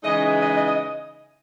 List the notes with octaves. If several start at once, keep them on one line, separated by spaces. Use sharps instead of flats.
C#3 E3 G#3 D#4 D#5
D#5
D#5
D#5